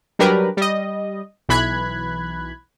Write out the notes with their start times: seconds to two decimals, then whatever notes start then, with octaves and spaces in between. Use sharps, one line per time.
0.19 F#3 G3 D4 G4 A#4 B4
0.57 G3 D#5
1.49 B1 E3 B5 F#6 G#6